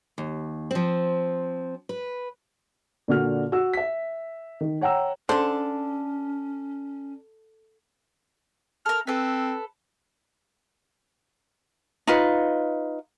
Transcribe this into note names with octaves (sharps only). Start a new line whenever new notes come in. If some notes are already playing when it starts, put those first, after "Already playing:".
D#2
F3 C4
B4
A#2 D3 F#4 F6
F#4 E6
E5 B6
D#3
C#5 F#5 G5 A#5 E6
D3 C#4 D4 A4 C5
A4 A#4 F6
C4 A4 B4
D#4 F4 B4